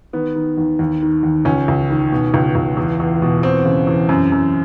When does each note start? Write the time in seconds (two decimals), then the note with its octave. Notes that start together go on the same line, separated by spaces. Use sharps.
0.13 D#3 B3
0.36 D#3
0.58 D#2
0.79 D#2
1.02 D#3
1.23 D#2
1.45 C#2 C#4
1.68 C#2
1.90 D#3
2.12 B2
2.34 C#2
2.55 C#2
2.77 E2
3.00 E2
3.22 B2
3.43 E2 C4
3.65 C#3
3.87 E2
4.09 F#2
4.32 F#2